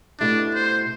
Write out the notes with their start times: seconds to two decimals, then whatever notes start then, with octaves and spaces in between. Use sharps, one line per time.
0.20 B2 A3 D4 E4 G4
0.54 C5